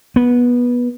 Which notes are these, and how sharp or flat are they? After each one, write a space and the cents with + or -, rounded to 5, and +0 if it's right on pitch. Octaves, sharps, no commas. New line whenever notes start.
B3 -15